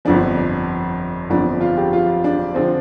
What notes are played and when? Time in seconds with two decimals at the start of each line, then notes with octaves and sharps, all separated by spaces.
0.05 G1 F2 F3 D4
1.30 G1 F2 F3 D4
1.61 F4
1.77 G4
1.93 F4
2.24 D4
2.54 D3 F3 C4